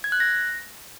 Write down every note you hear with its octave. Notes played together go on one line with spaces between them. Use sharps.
G#6
F#6
A#6